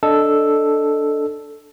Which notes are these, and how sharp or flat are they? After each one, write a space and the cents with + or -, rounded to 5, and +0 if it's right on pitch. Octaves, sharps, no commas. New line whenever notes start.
D4 +0 A4 +0 D#5 +0